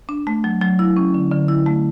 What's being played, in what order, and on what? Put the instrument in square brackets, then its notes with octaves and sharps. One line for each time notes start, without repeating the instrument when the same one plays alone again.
[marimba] D4
A3
F#3
F#3
E4
C#4
D3
D3
E4
A3